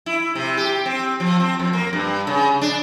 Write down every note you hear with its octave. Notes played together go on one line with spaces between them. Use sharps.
E4
C3
G4
C4
F3
C4
F2
A#3
G2
C#3
D4